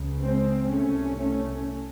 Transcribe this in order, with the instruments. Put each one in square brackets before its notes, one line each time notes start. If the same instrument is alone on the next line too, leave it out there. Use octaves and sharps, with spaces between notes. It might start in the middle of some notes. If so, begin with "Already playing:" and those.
Already playing: [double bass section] C#2 C#3
G#3 C4
C2 C3 A3 C#4
A3 C#4